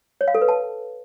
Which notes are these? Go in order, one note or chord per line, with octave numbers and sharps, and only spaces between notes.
C#5
F5
A4
B4
A5